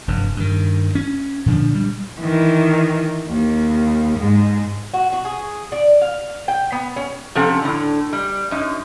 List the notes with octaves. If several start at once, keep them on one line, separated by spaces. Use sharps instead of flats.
F1 G2
G2 D#3
C#4
A#2 D3 F3 D4
G3
D#3 E3
D#2
G#2 G#3
F#4
F#4
G#4
D5
F5
G5
B3
C#4
C3 F3 C#4 A4 F#5
A2 D3
G3
F#2 D#4